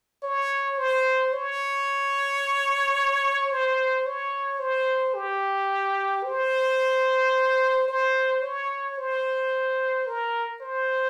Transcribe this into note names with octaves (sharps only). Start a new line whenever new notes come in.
C#5
C5
C#5
C5
C#5
C5
G4
C5
C5
C#5
C5
A#4
C5